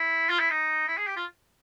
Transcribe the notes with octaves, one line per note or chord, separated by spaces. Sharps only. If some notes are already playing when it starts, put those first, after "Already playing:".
Already playing: E4
F4
E4
D#4
E4
G#4
G4
F4